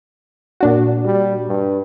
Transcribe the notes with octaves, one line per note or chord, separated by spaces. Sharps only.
A#2 D4 F#4
G3
G2